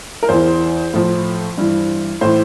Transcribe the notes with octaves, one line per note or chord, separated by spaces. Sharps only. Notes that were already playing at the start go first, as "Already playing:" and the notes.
A#4
E2 E3 C5
A2 F3
G2 E3
A2 E3 C5